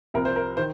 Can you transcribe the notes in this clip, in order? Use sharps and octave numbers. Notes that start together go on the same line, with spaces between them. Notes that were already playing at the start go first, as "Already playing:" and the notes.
C2 C3 F3 A#4
C5
A#4
D#3 C5